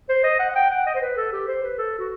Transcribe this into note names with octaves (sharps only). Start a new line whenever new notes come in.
C5
D#5
F#5
F#5
G5
F#5
D#5
C5
B4
A4
G4
C5
B4
A4
F#4